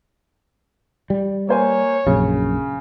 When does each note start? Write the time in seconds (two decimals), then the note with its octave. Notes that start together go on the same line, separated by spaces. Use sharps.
1.10 G3
1.49 A#3 C5 C#5 G#5
2.06 A#1 F#2 C#3